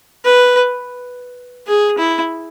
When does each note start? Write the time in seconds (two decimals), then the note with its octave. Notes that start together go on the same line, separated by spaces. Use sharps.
0.25 B4
1.68 G#4
1.98 E4